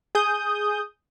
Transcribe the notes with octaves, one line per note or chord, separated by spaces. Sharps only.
G#4 D#6 G6